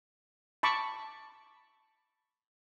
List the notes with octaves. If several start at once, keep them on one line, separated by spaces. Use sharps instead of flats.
A5 B5 C#6 D6